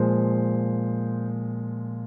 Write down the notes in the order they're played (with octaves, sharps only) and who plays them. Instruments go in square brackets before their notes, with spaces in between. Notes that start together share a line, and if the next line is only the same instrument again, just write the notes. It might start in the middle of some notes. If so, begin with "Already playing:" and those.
Already playing: [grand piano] A#2 F3 G#3 C5